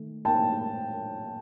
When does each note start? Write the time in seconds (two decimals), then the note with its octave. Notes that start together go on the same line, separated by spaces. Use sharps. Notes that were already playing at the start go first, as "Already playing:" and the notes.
Already playing: D#3 A3
0.25 G5 A5